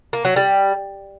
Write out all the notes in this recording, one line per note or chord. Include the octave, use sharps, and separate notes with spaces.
A#3
F#3
G3